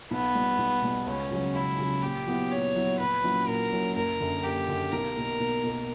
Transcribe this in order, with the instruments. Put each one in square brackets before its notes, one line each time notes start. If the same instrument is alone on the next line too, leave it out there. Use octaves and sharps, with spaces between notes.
[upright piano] B1 [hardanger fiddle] B3
[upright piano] B2 G3
B1
B2 G3
[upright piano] C#2 [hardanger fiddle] C#4
[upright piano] C#3 F#3
[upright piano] C#2 [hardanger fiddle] E4
[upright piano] C#3 F#3
[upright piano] A#2 [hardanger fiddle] G4
[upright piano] F#3 B3 E4
[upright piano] A#2 [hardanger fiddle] C#5
[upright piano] F#3 B3 E4
[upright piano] A#1 [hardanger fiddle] B4
[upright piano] A#2 F#3 C#4 E4
[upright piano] A#1 [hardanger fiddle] A#4
[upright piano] A#2 F#3 C#4 E4
[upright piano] F#1 [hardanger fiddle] A#4
[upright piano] F#2 D3
[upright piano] F#1 [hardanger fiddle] G4
[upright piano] F#2 D3
[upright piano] B1 [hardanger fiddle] A#4
[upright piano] B2 A#3
B1
B2 A#3